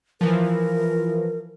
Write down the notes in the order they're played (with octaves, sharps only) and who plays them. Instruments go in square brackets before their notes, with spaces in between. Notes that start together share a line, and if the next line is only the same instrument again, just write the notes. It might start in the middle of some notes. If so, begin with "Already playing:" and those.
[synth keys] E3 F3 [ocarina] A#4